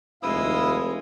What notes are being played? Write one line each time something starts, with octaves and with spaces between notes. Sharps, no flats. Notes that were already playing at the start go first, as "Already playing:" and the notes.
F1 D#2 G#3 E4 F4 F5 D#6 E6